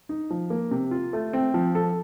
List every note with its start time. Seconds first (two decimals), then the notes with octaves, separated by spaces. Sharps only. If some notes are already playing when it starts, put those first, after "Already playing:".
0.09 D#4
0.30 F3
0.50 A#3
0.71 C3
0.91 F4
1.13 A3
1.33 C4
1.54 F3
1.75 A4